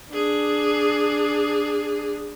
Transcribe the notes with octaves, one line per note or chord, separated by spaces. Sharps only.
D4 G#4